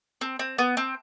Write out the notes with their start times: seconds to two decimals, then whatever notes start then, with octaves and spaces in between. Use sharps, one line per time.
0.21 C4
0.39 C4
0.58 B3
0.77 C4